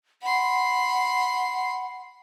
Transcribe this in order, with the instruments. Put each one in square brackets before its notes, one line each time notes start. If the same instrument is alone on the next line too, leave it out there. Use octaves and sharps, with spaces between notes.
[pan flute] F#5 [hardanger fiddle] B5 C6